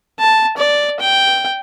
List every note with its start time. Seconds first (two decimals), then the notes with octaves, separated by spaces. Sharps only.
0.19 A5
0.57 D5
1.00 G5